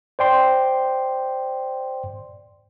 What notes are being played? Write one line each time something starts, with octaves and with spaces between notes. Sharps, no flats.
C5 D5 G5 C6